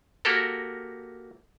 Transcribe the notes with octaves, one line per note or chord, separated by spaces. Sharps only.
A#3 F#4 G4 A4 A#4